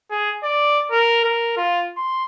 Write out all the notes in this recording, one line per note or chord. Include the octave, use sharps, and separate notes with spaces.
G#4
D5
A#4
A#4
F4
C6